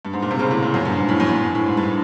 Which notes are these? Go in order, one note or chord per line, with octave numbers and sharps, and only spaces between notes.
G2
G#2
A#2
C3
C#3
A2
A#2
F#2
G2
G#2
A2
F#2
F#2
G2
A2
G#2
G2